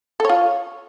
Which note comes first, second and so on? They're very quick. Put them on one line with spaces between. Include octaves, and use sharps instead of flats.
A4 C#5 F4